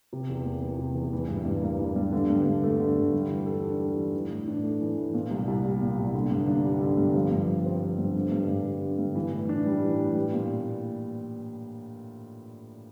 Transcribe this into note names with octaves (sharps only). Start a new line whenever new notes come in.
C3
E2
A#3
E3
C3
E2
E3
G2
G2
A#3
E3
G2
D3
G2
G2
A3
D3
G2
G3
E3
A4
D4
G3
E3
E3
A2
D4
A3
E3
A2
A#2
C2
C2
G3
A#2
C2
D3
G2
D4
G3
D3
G2
F3
G2
G4
C4
F3
G2
D3
G2
G2
G3
D3
G2
E3
A2
D4
G3
E3
A2
G3
A#2